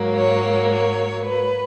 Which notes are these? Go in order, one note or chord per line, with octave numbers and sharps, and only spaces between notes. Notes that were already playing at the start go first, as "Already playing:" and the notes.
Already playing: G#2 F#3 A#3
C#5
C#5
B4